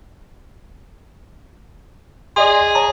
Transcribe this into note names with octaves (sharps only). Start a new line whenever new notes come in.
G#4 D5 D#5 C6
C#5 A5 A#5